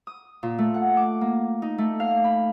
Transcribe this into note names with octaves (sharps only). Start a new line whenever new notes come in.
D#6
A#2
A3
F#5
D6
A#3
D#4
A3
F5
B5